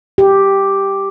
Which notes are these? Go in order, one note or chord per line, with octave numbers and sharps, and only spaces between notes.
G4